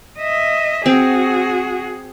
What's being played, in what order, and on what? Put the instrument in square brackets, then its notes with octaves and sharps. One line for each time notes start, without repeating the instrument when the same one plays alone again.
[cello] D#5 E5
[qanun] C4 [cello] F#4 G#4